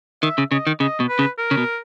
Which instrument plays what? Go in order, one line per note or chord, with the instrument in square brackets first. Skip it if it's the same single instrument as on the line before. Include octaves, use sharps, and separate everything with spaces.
[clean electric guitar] D#3 [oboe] E5
[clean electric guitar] C#3
[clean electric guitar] C#3 [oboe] D#5
[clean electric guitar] D#3
[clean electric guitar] C#3 [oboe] D#5
[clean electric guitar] B2
[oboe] B4
[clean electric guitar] C#3
[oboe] A#4
[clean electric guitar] C#3
B2